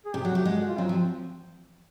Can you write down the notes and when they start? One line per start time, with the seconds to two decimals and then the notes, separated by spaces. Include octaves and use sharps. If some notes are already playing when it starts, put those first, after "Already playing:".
0.05 G#4
0.14 C3 G4
0.25 F#3 F#4
0.35 A3 G4
0.45 G#3 F#4
0.57 F#4
0.68 F4
0.78 F#3 C4
0.89 F3